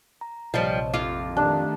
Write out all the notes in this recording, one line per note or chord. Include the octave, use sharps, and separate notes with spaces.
A#5
A#1 C3 F3 G3 C5 C#5 D#5 A5
F2 F4 D6
D#3 A3 D4 G4